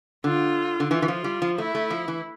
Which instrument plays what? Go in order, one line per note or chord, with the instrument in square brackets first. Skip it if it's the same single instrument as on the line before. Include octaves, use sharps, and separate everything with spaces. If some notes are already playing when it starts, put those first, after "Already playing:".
[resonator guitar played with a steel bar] D3 [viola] F4
[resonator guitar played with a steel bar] D3
[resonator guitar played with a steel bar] E3 [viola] F4
[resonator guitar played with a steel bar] E3
F3
G3
F3
[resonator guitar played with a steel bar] A3 [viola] E4
[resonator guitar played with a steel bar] A3
F3
E3